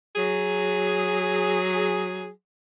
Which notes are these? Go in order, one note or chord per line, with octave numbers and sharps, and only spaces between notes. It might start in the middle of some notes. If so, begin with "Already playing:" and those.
F#3 G#4